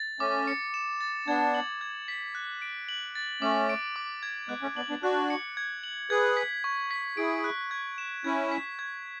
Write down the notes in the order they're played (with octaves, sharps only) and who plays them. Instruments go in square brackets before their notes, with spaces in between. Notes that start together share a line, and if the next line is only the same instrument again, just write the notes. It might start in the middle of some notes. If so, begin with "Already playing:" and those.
Already playing: [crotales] A6
[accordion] A3 C#4 [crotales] D6
[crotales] C#7
E7
A6
[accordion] B3 D4 [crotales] G#6
[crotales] F#7
G#6
B6
F#6
D7
F#7
A6
[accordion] A3 C#4 [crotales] D6
[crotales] D7
D6
G#6
[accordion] G#3 B3 [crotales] F#6
[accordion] A3 C#4
[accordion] B3 D4 [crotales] F#7
[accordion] B3 D4
[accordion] D4 F#4 [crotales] F#6
[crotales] C#7
G#6
F#7
[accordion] G#4 B4 [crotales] G#6
[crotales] B6
C#6
B6
[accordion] E4 G#4 [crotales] D7
[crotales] F#6
G#6
E7
[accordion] C#4 E4 [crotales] G#6
[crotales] B6
G#6